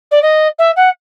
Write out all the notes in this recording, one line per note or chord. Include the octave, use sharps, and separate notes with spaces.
D5
D#5
E5
F#5